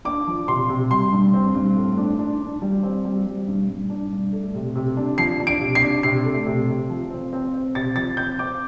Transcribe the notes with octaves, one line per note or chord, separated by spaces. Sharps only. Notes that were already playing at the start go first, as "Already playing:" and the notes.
D4 D6
F3
C3 C6
C3
G3 C6
G2
C4
G2
A2
D4
D4
D4
G3
C4
G3
G3
G2
G2
D4
G2
A3
C3
C3
D4
F3 C7
D4
D7
C3
C7
D4
C3 C7
A3
C3
C3
F3
C4
C4
C4
C3 A6
F3 A6
C4 G6
C4 D6